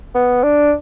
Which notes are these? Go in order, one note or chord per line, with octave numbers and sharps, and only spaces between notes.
B3
D4